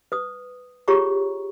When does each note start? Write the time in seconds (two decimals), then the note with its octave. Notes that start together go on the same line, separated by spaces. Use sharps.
0.12 B4 D#6
0.88 F4 G4 G#4 C#5 A#5 C#6